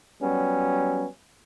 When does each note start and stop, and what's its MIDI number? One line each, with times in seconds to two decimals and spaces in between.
0.22 1.06 54
0.22 1.06 55
0.22 1.06 59
0.22 1.06 61